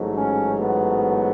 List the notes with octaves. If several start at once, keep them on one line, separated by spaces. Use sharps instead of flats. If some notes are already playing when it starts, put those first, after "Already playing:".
Already playing: A1 G#2 F#3 A3
C#4
B3